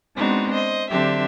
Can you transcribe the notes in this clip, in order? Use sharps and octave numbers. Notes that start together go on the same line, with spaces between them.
G#3 B3 C4 D4 D#4 F#4
C5 D#5
D3 F#3 C4 D4 G4 E5